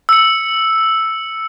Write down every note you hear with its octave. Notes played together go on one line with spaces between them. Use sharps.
E6 C#7